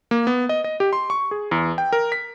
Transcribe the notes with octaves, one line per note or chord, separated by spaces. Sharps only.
A#3
B3
D#5
D#5
G4
C6
C#6
G#4
E2
G5
A#4
B6